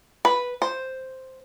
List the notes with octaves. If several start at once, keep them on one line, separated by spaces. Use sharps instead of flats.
B4
C5